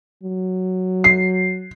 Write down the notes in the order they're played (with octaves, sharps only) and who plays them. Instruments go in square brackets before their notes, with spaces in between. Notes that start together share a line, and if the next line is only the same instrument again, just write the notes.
[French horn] F#3
[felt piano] C7